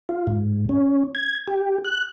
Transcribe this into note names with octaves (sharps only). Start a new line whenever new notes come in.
F4
G#2
C#4
G#6
G4
F#6